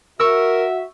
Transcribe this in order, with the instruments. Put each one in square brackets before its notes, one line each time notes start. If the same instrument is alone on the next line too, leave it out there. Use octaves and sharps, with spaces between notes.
[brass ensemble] F#4 E5 [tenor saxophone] A#4 [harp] C#6 E6